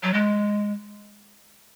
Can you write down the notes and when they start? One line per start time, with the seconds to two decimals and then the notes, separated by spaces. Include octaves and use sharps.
0.03 F#3
0.14 G#3